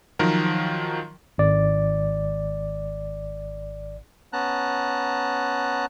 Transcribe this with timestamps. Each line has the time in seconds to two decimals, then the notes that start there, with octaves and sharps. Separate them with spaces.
0.19 D#3 F3 F#3 A#4
1.38 G#1 D5
4.33 B3 C#4 A5 A#5 F#6